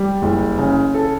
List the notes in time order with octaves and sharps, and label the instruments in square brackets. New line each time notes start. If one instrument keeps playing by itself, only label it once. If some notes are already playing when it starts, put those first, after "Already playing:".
Already playing: [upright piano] G3
F#1
C#3
A4